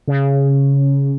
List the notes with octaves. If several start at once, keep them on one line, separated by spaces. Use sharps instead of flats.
C#3